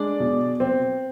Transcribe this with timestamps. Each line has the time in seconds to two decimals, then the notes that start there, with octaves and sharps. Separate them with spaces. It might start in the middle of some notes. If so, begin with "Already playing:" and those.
Already playing: G#3 D4 D5
0.20 B2
0.60 C4